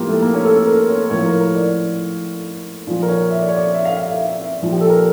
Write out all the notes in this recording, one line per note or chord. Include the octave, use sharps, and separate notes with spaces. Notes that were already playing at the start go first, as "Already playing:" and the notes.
Already playing: A2 F3 A#3 F4 G4
A3
A#3
C#4
A4
A4
A#4
C#5
A#4
A2 F3 C#5
A#4
A#4
D5
A#2 F3
A#4
C#5
E5
D5
C#5
D5
E5
F5
F5
E5
E5
E5
A#2 F3
G4
A4
A#4